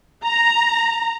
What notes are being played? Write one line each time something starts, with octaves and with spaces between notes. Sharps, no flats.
A#5